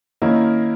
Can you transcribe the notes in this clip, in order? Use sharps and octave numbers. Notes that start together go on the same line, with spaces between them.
D#3 A#3 C#4 E4